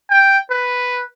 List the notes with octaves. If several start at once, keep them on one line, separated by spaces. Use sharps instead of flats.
G5
B4